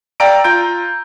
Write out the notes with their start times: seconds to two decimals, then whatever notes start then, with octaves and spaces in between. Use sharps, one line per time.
0.20 D5 F5 G5 A#5 E6 D7
0.44 F4 A#5 G6 D7